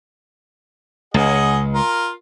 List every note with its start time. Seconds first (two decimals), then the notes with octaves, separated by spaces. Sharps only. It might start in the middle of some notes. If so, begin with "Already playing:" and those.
1.14 C#2 G#4 D#5 F#5
1.74 F4 A#4